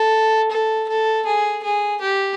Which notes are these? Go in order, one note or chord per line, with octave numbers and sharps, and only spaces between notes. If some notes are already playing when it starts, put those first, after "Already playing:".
Already playing: A4
A4
A4
G#4
G#4
G4